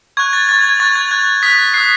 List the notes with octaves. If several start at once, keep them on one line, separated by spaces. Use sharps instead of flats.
C#6 F#6 G#6
A6
C#6 F#6 A6
G#6
G#6
C#6 F#6 A6
G#6
C#6 F#6 G#6
D#6 F#6 B6
D#6 F#6 C7